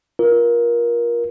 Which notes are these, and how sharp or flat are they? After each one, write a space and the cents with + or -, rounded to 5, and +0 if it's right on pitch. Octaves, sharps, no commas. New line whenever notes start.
F4 +0 A#4 +25